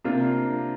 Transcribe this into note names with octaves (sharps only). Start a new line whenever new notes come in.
C3 A#3 D4 F4